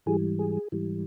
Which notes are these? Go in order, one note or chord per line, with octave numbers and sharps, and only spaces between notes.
G#2 E3 G3 G#4
G#4
G#2 E3 G3